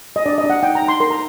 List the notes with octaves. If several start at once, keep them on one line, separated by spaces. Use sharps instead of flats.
D#5
D4 D5
D#5
D4
F#5
D#4 G5
A#5
D#4
C6
A#4 C6
A#5